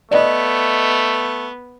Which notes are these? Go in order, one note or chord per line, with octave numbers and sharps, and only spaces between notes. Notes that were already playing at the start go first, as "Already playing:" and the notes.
A3 B3 D5 D#5